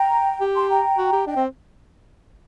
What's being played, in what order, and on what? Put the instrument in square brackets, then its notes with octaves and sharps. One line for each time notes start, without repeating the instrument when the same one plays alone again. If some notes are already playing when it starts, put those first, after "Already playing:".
Already playing: [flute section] G5 A#5
[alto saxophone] G4
[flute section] A5 C6
G5 A#5
[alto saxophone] F#4
G4
[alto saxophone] D4 [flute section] D#5 G5
[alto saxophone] C4